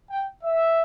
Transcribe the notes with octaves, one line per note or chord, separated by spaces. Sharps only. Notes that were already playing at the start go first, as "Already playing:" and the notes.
G5
E5